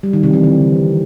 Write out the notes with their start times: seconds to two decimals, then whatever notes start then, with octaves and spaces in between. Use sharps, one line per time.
0.03 G3
0.13 D#3
0.23 C3
0.33 E3
0.43 D3